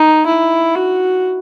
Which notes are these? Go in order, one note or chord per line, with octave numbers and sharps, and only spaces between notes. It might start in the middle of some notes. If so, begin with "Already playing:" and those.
Already playing: D#4
E4
F#4